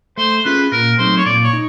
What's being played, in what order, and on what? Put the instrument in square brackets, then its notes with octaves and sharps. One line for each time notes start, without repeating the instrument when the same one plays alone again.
[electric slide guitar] A3 [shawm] C5
[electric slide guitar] C#4 F4 G#4 [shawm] B4
[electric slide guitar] A#2 [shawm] A#4
[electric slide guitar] F#3 A3 C4 D#4 [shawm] C5
[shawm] C#5
[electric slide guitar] A#2 [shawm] D5
[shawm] C#5
[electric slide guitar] D#4